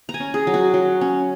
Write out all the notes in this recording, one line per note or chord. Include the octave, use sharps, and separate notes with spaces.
A#5
G#5
C#4
G#4
F#3
F#4
F#3
C#4